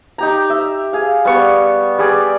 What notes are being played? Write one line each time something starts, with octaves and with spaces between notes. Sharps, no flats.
D#4 G4 A#5
E5
G#4 F5
G3 B3 C#6
G3 G#4 D5